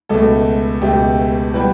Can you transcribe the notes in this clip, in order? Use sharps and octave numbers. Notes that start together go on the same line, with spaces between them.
C#2 B2 A3 A4
C#2 B2 A3 G4
E3 G3 B3 G4 B4